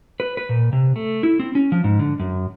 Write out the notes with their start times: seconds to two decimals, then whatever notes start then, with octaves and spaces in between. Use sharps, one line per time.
0.20 B4
0.37 B4
0.49 A#2
0.73 C3
0.96 A3
1.23 E4
1.40 C4
1.55 C#4
1.72 F3
1.84 G#2
1.99 D3
2.20 F#2